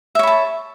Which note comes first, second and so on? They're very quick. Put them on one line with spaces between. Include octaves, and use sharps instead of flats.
E5 C#5 B5 A5